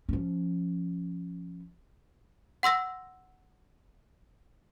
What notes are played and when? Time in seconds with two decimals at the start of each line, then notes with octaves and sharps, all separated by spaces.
0.09 F3 C#4
2.63 F#5 C6 E6 A#6